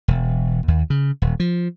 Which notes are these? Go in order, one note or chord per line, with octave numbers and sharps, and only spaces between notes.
E1
D#2
C#3
D#1
F3